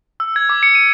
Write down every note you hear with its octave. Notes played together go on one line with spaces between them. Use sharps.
E6
G#6
D6
C#7
D#7